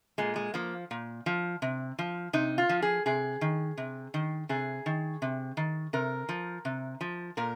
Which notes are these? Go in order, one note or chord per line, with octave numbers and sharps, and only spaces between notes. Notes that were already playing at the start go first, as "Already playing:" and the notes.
A#2 G#3
G#3
F3 A#3
A#2
F3
C3
F3
C3 D#4
F4
F3
G#4
C3 G#4
D#3
C3
D#3
C3 G#4
D#3
C3
D#3
C3 A#4
F3
C3
F3
A#2 A#4